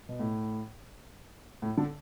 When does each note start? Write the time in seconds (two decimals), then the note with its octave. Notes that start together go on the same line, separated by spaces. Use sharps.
0.09 B2
0.20 A2
1.62 A2
1.77 D3